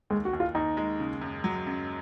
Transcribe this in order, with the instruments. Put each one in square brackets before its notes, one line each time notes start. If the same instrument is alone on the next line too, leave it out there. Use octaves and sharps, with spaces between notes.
[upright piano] D#2 [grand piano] G#3
[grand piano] F#4
[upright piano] D#2
[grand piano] F4
[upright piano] D#2 [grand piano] D#4
[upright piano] G#3
C#3
F#2
F#3
F#2